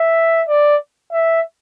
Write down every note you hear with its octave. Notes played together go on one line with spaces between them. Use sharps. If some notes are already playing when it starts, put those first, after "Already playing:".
Already playing: E5
D5
E5